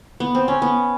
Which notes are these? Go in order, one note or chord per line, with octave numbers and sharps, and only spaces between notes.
B3
C4
C#4
B3